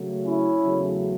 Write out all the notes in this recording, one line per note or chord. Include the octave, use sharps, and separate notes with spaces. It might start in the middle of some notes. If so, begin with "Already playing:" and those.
Already playing: C#3 F#3 A3
C#4 E4
E2 C#3 F#3 A3